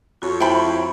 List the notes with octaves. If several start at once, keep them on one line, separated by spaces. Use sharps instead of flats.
F2 F#4 C#5
E4 C5 G5 A5 B5